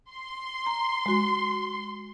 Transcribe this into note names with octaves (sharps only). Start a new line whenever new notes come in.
C6
A#5
G#3 F#4